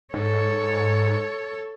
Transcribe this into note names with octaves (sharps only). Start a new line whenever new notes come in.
G#2 A4 C#5